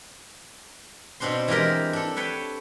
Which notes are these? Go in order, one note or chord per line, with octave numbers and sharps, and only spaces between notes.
B2 C4 D4 C5 C6
E3 G#3 G4 A#4 D5
D4 A4
B4 C#5 G5 A5